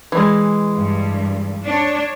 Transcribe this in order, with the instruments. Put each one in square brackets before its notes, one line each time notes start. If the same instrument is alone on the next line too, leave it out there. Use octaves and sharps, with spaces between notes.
[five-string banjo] E3 G#3
[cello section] G2
D4 C#5